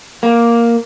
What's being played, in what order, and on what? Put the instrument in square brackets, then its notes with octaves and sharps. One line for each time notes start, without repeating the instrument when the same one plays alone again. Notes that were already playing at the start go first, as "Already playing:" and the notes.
[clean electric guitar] A#3